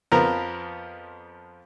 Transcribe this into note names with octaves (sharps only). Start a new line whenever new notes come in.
F2 F3 B3 A#4 A#5